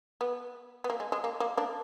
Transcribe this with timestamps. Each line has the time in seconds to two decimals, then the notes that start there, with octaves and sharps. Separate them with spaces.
0.21 B3
0.84 B3
0.90 A#3
1.00 G#3
1.12 G#3
1.24 A#3
1.40 A#3
1.57 A#3 D4